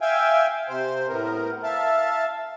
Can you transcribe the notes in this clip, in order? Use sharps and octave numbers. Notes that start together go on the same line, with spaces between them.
E5 F5 G5 G#5
C3 C5
A2 B3 A#4
E5 F5 A5